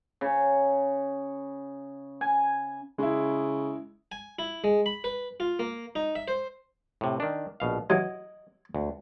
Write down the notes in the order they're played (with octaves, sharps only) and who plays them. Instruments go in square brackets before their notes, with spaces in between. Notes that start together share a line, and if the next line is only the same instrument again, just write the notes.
[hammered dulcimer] C#3
G#5
[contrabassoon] C#3 [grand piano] G#3 E4
[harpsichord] G#5
E4
G#3
B5
B4
F4
A#3
D#4
E5
C5
[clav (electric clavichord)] A2 C3
D#3 D4
A#1 B2 F5
[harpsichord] E3 F#3 [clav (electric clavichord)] D#5
[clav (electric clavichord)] D2